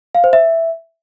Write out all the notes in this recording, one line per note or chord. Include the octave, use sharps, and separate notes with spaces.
F5
C5
E5